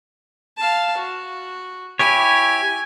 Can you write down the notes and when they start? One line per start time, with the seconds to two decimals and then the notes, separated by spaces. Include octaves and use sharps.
0.57 F5 A5
0.97 F#4
1.99 E4 G4 C#5 G#5